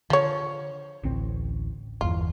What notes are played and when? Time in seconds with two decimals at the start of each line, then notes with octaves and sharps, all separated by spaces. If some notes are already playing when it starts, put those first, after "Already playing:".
0.10 D3 F3 C#5
1.03 A1 D2 C4
2.01 G1 E2 F4